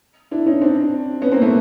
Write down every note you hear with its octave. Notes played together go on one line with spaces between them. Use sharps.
D4 E4
C#4 D#4
C4 D4
B3 C#4
A#3 C4
A3 B3